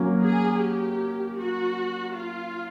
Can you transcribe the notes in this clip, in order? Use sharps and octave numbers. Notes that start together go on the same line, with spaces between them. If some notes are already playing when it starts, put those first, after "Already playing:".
Already playing: F#3 A#3 C#4
G#4
G4
F#4
F4